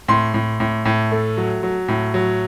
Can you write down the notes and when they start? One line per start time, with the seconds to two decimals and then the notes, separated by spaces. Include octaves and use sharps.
0.08 A2 C6
0.34 A2
0.60 A2
0.85 A2
1.11 A3
1.37 F#3
1.63 F#3
1.88 A2
2.14 F#3